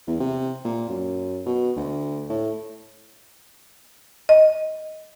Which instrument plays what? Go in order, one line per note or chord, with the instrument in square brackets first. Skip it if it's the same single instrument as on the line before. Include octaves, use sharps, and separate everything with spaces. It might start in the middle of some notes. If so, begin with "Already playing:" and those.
[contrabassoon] E2
C3
A#2
F#2
B2
D2
A2
[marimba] D#5